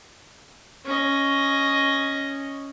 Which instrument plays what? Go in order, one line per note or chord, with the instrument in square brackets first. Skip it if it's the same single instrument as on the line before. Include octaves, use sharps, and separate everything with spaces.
[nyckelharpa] C#4 D#5